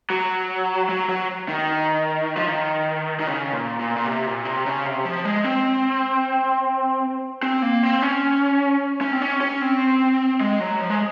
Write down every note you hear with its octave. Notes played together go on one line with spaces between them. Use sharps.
F#3
F#3
F#3
D#3
F3
D#3
D#3
C#3
A#2
A#2
A#2
C3
A#2
C3
C#3
C3
F3
G#3
C4
C4
A#3
C4
C#4
C#4
C4
C#4
C#4
C4
G#3
F#3
F3
G#3